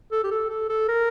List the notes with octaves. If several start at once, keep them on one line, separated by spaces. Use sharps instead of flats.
A4
G4
A4
A4
A4
A#4